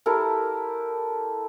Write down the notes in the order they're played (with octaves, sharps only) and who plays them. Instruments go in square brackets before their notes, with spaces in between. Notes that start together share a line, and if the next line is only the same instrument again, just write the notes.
[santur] E4 G4 A4 A#4